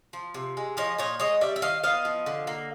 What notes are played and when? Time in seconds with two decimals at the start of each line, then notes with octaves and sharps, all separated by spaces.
0.13 F3
0.34 C3
0.57 G#3
0.77 F3 C#5 D#5
0.98 A#2 C#5 D#5
1.20 G#3 C#5 D#5
1.41 G3 D5 E5
1.56 E5
1.62 D#3 D#5 F5
1.84 B3 D#5 F5
2.05 F3
2.26 D3
2.47 A#3